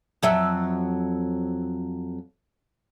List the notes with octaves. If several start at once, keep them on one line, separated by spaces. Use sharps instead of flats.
F2 F#3 E5